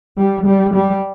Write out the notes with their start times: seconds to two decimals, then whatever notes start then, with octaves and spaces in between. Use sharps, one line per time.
0.18 G3
0.46 G3
0.75 G3